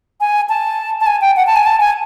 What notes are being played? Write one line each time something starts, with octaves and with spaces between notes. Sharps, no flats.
G#5
A5
A5
G#5
G5
F#5
A5
G#5
A5
G#5